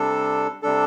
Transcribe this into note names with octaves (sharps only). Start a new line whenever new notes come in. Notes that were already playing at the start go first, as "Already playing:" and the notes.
Already playing: C3 G3 D4 A4
C3 G3 D4 A4